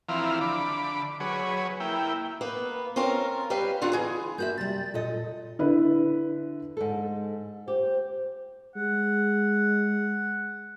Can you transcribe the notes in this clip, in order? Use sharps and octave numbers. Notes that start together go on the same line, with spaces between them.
E3 F3 C4 E4 F5 A#5
D3 B5 D6
F#3 G#4 B4 C#5
A#3 E4 G5
A#3 B3 B4
C4 C#4 F4 A#4
G3 G4 B4 F5
D3 F4 F#4 F#5 A#5
E3 G#4
A#3 F#4 E5 G6
C3 G3 A6
A#2 A4 D#5
D3 E4 B4
G#2 A4
G4 C5
G#3 F#5